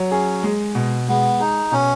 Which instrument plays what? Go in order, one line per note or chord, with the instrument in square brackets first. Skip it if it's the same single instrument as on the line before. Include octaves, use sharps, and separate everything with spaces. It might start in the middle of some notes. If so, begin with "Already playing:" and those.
Already playing: [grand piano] F#3
[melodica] C#4 [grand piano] G#4
[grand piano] G#3
B2
[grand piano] G#3 [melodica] B3
[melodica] D#4 [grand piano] G#4
[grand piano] B2 [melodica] C#4